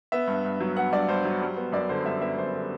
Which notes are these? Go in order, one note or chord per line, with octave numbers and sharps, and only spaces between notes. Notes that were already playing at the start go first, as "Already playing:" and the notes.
B3 E5
G2
G2
F#3
B3 F#5
G2 D5
G2 C5
F#3
G3
B3
F#2 D5
D3 C5
G3 E5
B3 E5
F#2 C5
D3